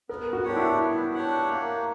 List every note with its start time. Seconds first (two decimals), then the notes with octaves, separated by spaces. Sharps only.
0.09 B3 A#4
0.33 F#4
0.44 D4 G4 C#5 F#5
0.56 E4
0.80 B3
1.15 D4 G4 C#5 F#5
1.50 A#3